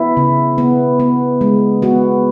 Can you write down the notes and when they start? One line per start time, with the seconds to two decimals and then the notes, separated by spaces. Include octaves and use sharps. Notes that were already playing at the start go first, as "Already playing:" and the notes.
Already playing: B3 E4
0.17 C#3
0.58 B3
1.00 B3
1.41 G#3
1.82 B3 F#4